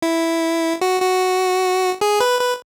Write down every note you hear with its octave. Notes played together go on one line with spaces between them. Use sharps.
E4
F#4
F#4
G#4
B4
B4